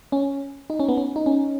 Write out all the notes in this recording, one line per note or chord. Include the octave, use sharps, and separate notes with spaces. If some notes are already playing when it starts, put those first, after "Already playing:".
C#4
D#4
C#4
B3
C#4
D#4
C#4